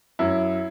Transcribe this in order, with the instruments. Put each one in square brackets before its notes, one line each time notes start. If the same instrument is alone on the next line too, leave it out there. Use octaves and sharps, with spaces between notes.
[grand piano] F#2 E4